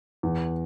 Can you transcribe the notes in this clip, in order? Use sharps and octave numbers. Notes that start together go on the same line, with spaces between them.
E2